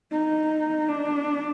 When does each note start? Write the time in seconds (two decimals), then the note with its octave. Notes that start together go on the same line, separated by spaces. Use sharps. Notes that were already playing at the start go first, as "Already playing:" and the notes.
0.12 D#4
0.88 D4